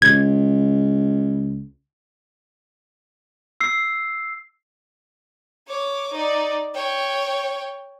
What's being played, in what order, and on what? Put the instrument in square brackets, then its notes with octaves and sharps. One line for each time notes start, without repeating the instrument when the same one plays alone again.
[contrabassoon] C#2 [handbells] G#6
[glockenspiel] E6 C7
[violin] C#5 D6
D#4 D5
C#5 G5